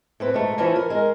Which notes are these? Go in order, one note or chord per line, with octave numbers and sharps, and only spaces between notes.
A2 C4 B4
G#2 A3
E3 F3 A3 C#4 E4
A#4
G#3 A#4